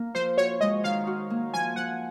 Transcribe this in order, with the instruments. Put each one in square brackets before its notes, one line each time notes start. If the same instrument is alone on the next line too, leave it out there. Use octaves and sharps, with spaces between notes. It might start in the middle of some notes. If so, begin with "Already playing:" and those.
Already playing: [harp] A#3
[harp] F3 [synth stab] C5
[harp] F#4 [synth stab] C#5
[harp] G#3 [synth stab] D#5
[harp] D#3 [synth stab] F5
[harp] F#4
A#3
[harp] F3 [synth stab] G#5
[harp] F3 [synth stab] F#5